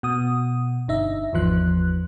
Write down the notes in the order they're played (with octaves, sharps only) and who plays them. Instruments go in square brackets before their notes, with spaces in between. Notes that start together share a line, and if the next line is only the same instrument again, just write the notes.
[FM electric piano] B2 D#6
G1 D#4 E5
G#1 E2 F3 F#6